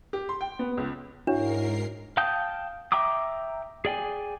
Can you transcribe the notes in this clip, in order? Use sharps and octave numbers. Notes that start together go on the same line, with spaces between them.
G4
C6
G5
B3
C#2
G#2 D4 E4 F#4 A#4 C#5 C7
F5 G5 A5 D#6 G6
E5 G5 A#5 D6 D#6
G#4 D5 G5 G#5